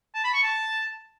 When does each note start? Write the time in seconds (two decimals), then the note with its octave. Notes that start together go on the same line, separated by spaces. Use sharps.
0.15 A5
0.24 B5
0.34 C#6
0.43 A5